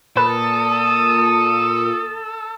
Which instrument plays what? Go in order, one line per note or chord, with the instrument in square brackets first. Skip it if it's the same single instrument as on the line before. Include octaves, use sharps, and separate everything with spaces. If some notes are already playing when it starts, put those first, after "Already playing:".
[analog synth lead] A#2 [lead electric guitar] A4 [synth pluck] B4 [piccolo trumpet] D#6